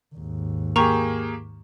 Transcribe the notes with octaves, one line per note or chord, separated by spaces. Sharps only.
D#2 G#2
A#3 G4 G#4 A#5 C#6 F7